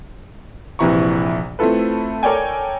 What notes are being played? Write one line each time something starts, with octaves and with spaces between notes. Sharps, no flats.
A#1 C3 E3 E4 A#5 C#6
A3 C4 E4 F4 A4 B4
A4 A#4 C#5 D5 G5 G#5